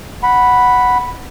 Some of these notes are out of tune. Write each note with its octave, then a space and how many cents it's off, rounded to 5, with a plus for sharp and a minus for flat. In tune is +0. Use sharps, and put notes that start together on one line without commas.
F#5 +0 B5 +0